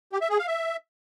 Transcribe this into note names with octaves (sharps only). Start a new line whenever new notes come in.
G4
E5
G#4
F5
E5